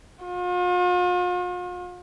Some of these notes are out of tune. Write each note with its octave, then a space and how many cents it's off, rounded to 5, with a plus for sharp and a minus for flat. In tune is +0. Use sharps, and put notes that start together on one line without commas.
F4 +45